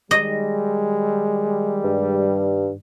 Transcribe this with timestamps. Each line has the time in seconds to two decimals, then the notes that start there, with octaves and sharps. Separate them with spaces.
0.11 D#3 G3 G#3 D#5
1.84 G2